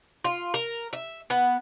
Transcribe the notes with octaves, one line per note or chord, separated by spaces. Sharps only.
F4
A#4
E5
B3